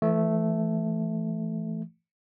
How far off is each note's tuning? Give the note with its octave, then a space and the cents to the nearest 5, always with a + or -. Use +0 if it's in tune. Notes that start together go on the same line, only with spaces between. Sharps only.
E3 +30 A3 +0